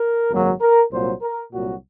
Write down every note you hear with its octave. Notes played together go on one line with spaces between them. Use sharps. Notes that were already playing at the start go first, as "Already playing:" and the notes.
Already playing: A#4
G#1 F#2 C#3 F#3 A#3
A#4
C2 A#2 F#3 A#3 C5
A#4
C2 A#2 F#3 F#4